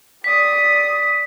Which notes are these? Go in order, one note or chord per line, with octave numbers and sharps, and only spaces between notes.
D5 D#6 B6